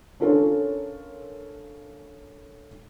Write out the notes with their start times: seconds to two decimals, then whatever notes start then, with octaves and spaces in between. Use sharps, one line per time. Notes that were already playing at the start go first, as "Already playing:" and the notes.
0.20 C#4 D4 F4 A4 A#4 C#5